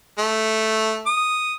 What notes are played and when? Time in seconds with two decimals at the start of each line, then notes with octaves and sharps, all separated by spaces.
0.19 A3
1.07 D#6